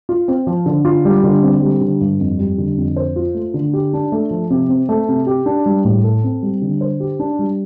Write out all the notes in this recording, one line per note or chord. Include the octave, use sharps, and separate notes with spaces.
F4
C4
F3
D3
F4
G3
D3
C4
G3
D3
G2
F2
G3
D3
F2
C5
F4
A3
D3
G4
D4
A3
F3
C3
C4
A3
C3
G4
D4
G3
A2
A4
C4
G3
D3
C5
G4
D4
G3